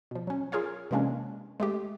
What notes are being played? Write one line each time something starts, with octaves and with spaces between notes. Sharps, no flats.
B2 F3
F#3 C#4
F4 G#4 A#4 C#5 F5
C3 E3 G#3 A#3 C#4 D4
G#3 A3 G4